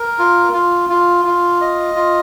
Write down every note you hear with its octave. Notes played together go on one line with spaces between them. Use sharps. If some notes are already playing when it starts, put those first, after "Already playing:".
Already playing: A#4
F4
F4
F4
F4
D#5
F4